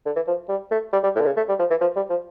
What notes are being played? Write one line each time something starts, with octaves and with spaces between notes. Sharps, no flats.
D3
E3
F3
G3
A3
G3
G3
A2
D3
C#3
A3
G3
F3
E3
F3
G3
F3